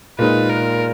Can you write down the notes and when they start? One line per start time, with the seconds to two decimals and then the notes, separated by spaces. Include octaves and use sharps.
0.19 A#2 G#3 D#4 B4
0.50 A#4